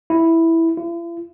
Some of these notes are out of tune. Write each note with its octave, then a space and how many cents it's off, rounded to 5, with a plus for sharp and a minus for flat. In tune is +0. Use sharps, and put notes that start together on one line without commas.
E4 -5
E4 +45